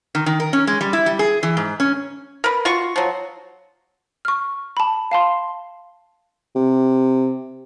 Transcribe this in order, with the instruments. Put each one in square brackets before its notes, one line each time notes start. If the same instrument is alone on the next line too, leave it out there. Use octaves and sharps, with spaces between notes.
[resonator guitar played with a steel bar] D#3
D#3
A#4
C#4
G#3
G3
E4
G3
G#4
E3
G#2
C#4
[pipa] A#4 B4
F4 F#4 C#6
F3 F#3
[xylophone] C#6 F6
A5 B5
F5 A5 C6
[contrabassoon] C3